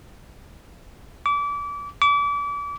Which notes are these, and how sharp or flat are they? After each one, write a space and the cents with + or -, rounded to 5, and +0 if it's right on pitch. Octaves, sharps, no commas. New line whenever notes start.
D6 -30
D6 -35